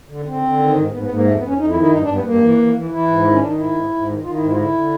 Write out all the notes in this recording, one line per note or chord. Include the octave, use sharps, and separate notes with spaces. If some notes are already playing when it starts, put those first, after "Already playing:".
D3
D3 C4
D3
D#3
G#2
G#2 B3
B3
G#2
A#3
F2 A3
B3
F2 C#4
F2 D#4
E4
D#3
E4
G2 D#4
D4
G2
B3
G2 A#3
E3
E3
E3
E3 E4
G#2
D#3
C#4
D#3 D4
D#4
G#2 E4
G#2
G#2
D#3
D#3 F4
E4
G#2
E4
F4
D3 E4
D3